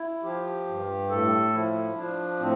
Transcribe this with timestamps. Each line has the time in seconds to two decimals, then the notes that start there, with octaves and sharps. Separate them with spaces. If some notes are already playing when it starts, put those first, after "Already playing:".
Already playing: E4
0.23 F3 G4
0.67 G2
1.09 A2 A4
1.53 F3 E4
1.97 F3 D4
2.39 A2 C4